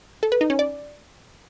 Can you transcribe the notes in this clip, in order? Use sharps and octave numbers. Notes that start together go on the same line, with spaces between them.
A4
B4
D#4
C#4
D5